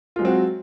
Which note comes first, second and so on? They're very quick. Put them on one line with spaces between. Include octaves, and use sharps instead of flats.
F4 G#3 F#3 C4 F#4